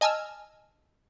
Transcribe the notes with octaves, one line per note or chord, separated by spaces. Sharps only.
D#5 G#5 A5 E6 F6